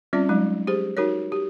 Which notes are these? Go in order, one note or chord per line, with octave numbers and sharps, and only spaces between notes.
G3 C4 C#4 F4 D5
F#3 G#3 D#4
G4 G#4 C5
D#4 F#4 A#4 C#5
G4